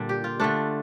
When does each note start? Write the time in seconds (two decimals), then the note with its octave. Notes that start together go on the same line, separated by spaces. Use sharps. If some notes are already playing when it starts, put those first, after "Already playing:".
Already playing: A#2 D3 G3 D4
0.09 G4
0.24 F4
0.40 D3 A3 D4